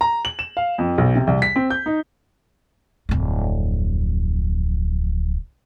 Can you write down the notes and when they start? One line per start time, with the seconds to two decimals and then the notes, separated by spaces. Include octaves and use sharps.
0.01 A#5
0.25 F#7
0.39 E7
0.57 F5
0.78 F2
0.98 B1
1.16 C3
1.27 C2
1.42 B6
1.56 C4
1.70 G6
1.86 D#4
3.09 D1 F2